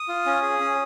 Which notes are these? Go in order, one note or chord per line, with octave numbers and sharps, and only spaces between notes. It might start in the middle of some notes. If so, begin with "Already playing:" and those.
Already playing: D#6
F4
C#4
G#4
C#4